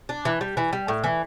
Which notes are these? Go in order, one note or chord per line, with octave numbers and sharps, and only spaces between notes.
D4
E3
G3
E3
G3
A2
E3